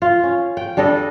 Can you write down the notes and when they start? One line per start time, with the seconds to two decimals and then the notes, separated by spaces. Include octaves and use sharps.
0.02 F4
0.23 C#4
0.57 G5
0.77 G3 D4 A4 D#5